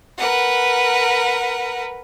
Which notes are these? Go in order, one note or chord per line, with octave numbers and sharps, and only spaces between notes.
A#4 B4 F#5